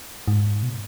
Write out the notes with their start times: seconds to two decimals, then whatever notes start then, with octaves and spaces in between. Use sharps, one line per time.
0.28 G#2
0.63 B2